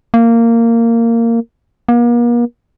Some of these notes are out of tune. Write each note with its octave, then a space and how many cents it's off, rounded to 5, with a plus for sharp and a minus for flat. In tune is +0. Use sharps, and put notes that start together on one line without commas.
A#3 -15
A#3 +40